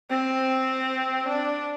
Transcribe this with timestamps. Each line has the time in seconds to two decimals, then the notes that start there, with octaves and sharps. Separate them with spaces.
0.10 C4
1.29 D4